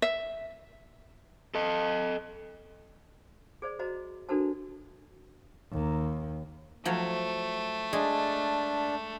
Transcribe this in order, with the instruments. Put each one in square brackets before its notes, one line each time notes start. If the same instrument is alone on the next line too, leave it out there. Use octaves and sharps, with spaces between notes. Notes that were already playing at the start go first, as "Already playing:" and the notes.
[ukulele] E5
[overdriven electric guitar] A4 D#5
[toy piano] G#4 C5 D5
F#4 C5 D#5 A#5
D4 F#4 A4 A#4 C5 A5
[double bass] D#2
[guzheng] F3 F#3 [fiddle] A3
[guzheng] G#3 G#4 [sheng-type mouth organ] D4